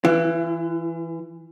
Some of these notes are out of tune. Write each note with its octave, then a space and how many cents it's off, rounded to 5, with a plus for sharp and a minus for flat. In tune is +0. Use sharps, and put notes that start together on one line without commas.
E3 +0 E4 +40